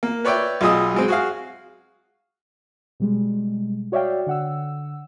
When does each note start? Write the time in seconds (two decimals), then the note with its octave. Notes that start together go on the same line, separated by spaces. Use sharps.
0.03 A#3
0.25 B4 C#5 D5 E5 G5
0.61 B1 F4 G#4 D#5 D#6 E6
0.94 F#3 G#3 C4
1.08 F#4 G#4 F5
3.00 B2 G3 G#3
3.92 F#4 C#5 D5 E5 F5 G5
4.27 D3 F#5 E6